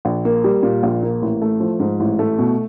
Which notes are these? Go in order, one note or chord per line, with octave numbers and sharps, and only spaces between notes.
A#1
A#3
G3
A#2
A#1
A#3
A1
A3
F3
G#2
A1
A3
B2